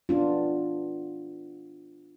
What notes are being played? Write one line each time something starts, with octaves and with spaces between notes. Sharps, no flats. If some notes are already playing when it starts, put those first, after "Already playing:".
B3 D4 F4